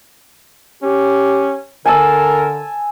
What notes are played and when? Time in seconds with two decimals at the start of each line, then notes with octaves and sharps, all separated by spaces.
0.83 C#4 G4
1.85 D3 A#4 G#5 A5 E6